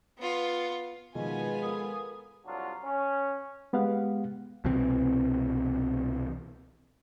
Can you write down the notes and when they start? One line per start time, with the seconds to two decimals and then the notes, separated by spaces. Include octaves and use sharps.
0.18 B3 F4
1.15 B2 D#3 F3 G#3 B3 F4 D#5 G#5
1.62 A4 A#4 B5 D#6
2.45 C2 F#3 D4 F4 F#4
2.83 C#4
3.73 G#3 B3 G4 F5 F#5
4.64 C2 B2 E3 C4